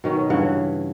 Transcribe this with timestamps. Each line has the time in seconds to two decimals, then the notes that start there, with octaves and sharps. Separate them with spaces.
0.04 B2 D#3 C#4
0.30 G2 C#3 E3 F#5